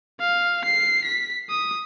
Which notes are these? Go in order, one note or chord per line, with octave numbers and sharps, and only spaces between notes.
F5
C7
B6
D#6